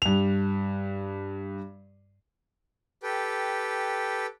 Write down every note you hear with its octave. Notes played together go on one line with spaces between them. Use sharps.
G2 F7
G4 A4 B4 G5